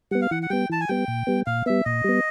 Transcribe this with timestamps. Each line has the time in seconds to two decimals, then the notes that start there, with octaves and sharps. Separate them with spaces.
0.11 G3 B3 F#5
0.22 F5
0.31 E3 F#5
0.43 F#5
0.50 G3 B3 G5
0.70 E3 A5
0.81 G#5
0.88 G3 B3 G5
1.08 A#2
1.27 G3 B3
1.46 A#2 F5
1.66 G3 B3 E5
1.85 A#2 D#5
2.04 G3 B3